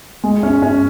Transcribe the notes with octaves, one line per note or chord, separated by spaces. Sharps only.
G#3
C#4
C#4